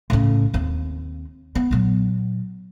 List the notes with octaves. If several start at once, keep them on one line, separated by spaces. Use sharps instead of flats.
A2 C#3
D#2 C4
B3
A#2 F#3